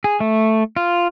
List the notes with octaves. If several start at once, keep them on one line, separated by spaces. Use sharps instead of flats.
G#4
A3
F4